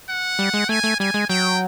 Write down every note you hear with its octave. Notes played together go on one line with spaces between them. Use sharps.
F#5
G3
G#3
A3 G#5
A3
G3 G#5
G#3
F#3 G5